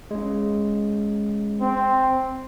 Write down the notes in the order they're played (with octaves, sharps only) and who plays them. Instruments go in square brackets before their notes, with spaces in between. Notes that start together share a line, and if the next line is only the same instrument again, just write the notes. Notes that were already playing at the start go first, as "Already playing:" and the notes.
[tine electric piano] G#3 C#4
[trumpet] C4